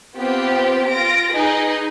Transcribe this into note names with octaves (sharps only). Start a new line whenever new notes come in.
B3 C4 F4 G4
F4 A#6 D7
D#4 G#4 B4 D#5